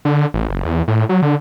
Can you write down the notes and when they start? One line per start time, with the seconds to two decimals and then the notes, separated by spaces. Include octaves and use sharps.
0.05 D3
0.34 A1
0.50 F#1
0.65 E2
0.88 A2
1.09 F#3
1.22 D3